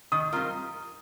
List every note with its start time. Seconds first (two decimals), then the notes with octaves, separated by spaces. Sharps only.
0.12 D#3 D#6
0.32 G3 C4 F4 A#4